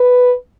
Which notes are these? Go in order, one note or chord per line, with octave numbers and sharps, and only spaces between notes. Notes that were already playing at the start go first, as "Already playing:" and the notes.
Already playing: B4